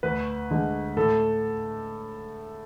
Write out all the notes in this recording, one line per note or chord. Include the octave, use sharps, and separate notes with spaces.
D2 B4
D3 G#3
A2 A4